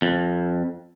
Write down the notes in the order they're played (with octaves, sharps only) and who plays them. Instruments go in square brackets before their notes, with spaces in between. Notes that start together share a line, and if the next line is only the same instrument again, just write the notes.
[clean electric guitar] F2